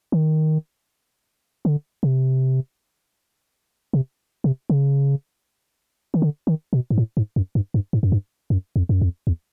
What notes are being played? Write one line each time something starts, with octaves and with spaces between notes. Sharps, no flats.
D#3
D3
C3
C3
C3
C#3
D#3
D3
D#3
B2
G#2
A2
G#2
F#2
G2
G2
G#2
F#2
G2
F#2
F2
F#2
F2
E2